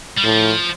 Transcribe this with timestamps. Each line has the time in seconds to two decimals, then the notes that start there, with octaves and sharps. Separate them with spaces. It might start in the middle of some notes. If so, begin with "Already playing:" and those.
0.18 G3
0.24 A2 F3